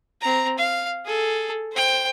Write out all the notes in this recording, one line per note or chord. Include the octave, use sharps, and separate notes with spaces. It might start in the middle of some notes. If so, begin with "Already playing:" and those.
C4 A#5
F5
G#4 A4
C5 G5